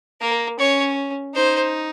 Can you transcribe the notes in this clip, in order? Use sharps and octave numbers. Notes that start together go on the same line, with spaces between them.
A#3 A#4
C#4 C#5
D#4 C5